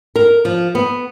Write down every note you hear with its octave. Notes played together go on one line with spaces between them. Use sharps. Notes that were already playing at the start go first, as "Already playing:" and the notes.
A#4
F3
B3